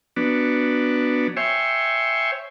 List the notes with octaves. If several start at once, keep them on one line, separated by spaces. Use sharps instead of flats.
F#3 B3 D4
C5 C#5 E5 G5 G#5